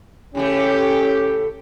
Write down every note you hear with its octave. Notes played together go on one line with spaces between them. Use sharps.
A2 C#3 A3 C#4 G4